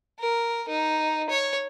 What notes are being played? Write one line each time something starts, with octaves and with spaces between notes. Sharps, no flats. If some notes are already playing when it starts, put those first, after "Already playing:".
A#4
D#4
C#5